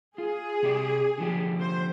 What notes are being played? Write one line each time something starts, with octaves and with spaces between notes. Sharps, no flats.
F4 G#4
C3 G4 D5
D3 F3 G4
C5